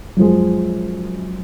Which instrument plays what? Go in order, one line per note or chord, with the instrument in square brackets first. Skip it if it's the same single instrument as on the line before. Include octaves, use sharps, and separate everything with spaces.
[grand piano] F#2 F3 G#3